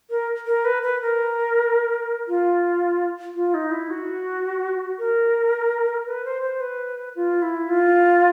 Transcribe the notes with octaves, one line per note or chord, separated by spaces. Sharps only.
A#4
A#4
B4
B4
A#4
F4
F4
D#4
E4
F#4
A#4
B4
C5
C5
B4
F4
E4
F4